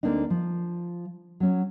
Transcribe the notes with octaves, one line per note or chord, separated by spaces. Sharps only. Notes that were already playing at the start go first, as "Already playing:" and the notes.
D2 A#3 C4 D4 D#4
F3
F#3 C#4